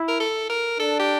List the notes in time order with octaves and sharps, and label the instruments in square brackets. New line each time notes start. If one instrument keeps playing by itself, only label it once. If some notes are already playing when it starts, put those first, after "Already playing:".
Already playing: [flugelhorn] E4
[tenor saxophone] A#4
A4
A#4
[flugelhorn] D4 [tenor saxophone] A4
[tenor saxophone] G4